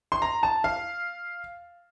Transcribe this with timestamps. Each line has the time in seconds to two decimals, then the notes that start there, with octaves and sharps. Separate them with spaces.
0.12 C6
0.22 A#5
0.43 A5
0.64 F5